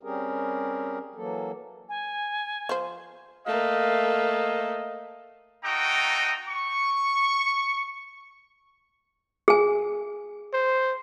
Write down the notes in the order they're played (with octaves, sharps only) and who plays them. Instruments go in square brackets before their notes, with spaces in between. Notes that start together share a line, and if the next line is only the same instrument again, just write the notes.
[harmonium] G3 C4 C#4 G4 G#4 A#4
E3 F#3 A#3 A4
[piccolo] G#5
[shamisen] F3 C5
[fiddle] A3 A#3 [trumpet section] D#5 F5
[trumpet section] A3 D#4 F#4 G5 A#5 D#6
C#6
[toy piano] G#4 G#5
[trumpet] C5